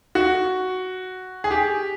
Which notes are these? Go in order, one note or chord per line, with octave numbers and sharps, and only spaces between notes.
F#4
G#4
G4